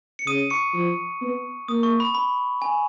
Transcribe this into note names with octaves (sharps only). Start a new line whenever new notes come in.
C#7
C#3 D#6 D#7
C#6 C#7
F3
B3
A#3 D#6
C#6
B5
B5
G#5